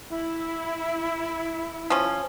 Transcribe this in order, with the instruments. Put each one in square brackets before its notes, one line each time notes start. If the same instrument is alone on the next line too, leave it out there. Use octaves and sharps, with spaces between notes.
[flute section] E4
[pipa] F3 C#4